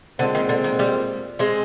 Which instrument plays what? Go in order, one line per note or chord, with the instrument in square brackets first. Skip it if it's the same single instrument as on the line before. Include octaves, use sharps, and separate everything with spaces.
[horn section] A#2 G#3 C4 [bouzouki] D3
[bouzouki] D#3
D3
D#3
G3
G#3 C4